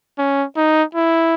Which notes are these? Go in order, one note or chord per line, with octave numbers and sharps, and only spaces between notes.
C#4
D#4
E4